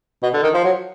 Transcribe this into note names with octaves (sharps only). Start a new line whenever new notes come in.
B2
D3
D#3
F3
F#3